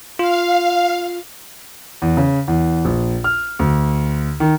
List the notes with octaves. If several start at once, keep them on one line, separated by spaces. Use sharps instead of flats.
F4 F5
E2
C#3
E2
A#1
F6
D2
D#3